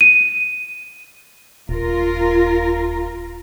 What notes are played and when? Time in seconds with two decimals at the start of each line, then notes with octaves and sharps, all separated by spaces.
0.01 D#7
1.69 D#1 F4 A#4